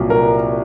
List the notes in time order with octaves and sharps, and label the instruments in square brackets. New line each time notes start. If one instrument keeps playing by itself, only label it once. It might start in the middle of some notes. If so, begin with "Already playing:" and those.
Already playing: [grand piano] C2 A#2 F#3
A#4